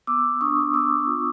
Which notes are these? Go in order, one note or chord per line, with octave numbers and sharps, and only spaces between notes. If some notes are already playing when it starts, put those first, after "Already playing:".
B3 D6 E6
D4 C#6 D#6
B3 D6 E6
F4